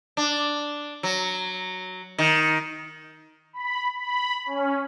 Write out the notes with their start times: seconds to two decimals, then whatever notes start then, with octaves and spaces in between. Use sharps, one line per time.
0.17 D4
1.03 F#3
2.18 D#3
3.53 B5
3.99 B5
4.46 C#4